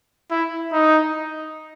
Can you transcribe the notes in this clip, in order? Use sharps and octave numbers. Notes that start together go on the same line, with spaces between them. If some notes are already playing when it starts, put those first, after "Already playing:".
E4
D#4